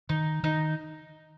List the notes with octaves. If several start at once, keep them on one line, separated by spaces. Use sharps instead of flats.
D#3 D#4
D#3 D#4